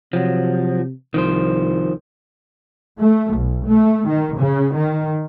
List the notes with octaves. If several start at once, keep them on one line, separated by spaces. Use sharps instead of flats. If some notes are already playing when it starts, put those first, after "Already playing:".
C3 F3 F#3
C2 D#3 F3 C5
A3
B1
A3
D#3
C#3
D#3